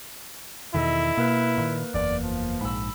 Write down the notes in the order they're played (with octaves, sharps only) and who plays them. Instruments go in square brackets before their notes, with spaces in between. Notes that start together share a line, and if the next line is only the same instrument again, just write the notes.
[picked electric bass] E2 B2 D#3 [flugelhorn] E4 [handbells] A4 D#5
[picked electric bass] B2 [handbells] A#3 A#4 B4
[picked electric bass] A#2 D#3
[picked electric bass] F#1 E2 [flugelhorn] D5
[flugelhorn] F3
[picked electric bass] A#1 G#2 [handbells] B5 E6